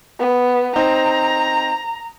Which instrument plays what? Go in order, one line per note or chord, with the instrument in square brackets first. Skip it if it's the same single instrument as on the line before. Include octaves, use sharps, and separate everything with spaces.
[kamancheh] B3
[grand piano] C4 D#4 [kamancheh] A#5